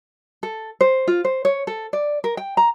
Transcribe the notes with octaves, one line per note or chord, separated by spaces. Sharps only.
A4
C5
F4
C5
C#5
A4
D5
A#4
G5
A#5